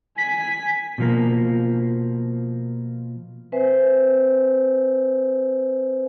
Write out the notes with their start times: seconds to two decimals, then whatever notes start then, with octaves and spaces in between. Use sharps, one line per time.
0.18 G#5 B6
0.98 B2 F3 A#3
3.52 C4 B4 C5 E5 G#5